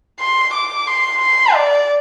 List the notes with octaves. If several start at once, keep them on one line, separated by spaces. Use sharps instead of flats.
C6
D6
C6
C6
D5